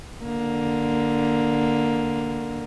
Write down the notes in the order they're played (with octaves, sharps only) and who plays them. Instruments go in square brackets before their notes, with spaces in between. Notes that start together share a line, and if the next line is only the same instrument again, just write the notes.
[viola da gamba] D3 A#3